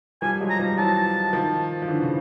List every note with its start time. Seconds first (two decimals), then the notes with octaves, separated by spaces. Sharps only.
0.22 F3 G3 G#5
0.41 F#3 G#3
0.50 A#5
0.59 F3 G3
0.77 E3 F#3 A5
1.33 D#3 F3
1.82 F3
1.88 D3 E3
2.02 C#3